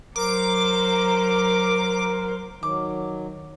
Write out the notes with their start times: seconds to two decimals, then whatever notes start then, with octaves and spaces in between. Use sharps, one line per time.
0.16 F#3 A#4 C5 A#5 D6
2.63 D#3 F#3 D6